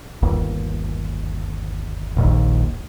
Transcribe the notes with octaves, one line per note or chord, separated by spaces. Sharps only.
G1 D#2
D#1 A#1 D#2